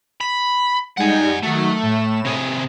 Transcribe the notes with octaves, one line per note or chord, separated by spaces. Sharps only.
B5
G3 G#3 D#4 F#5 G#5
D#3 F#3 A3
A2 E7
C3 G#4